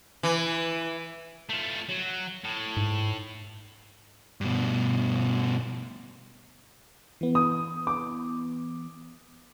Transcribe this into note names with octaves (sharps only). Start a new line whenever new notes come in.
E3
A3 F4
F#3
A2
G#2
G2 B2
E3 B3
D#6
D6